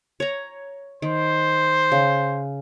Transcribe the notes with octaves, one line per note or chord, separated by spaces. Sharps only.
C#5 A#5
D#3 C5
C#3